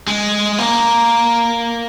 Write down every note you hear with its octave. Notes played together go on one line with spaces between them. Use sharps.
G#3
A#3